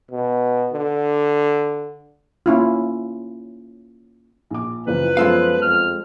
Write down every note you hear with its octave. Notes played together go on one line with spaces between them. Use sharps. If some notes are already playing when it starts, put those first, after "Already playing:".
B2
D3
A#3 C#4 E4 F4
A#1 D6
F#1 E3 F3 B4
F#2 F3 G#3 B3 F4 A4 F5
F2 F6